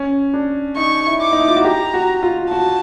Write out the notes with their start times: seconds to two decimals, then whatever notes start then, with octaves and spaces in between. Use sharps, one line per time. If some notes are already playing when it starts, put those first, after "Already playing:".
Already playing: C#4
0.34 D4
0.77 D#4 C#6
1.07 E4
1.21 D6
1.33 D#4
1.40 E4
1.48 F4
1.56 F#4
1.64 G4 A#5
1.94 F#4
2.23 F4
2.51 F#4 A5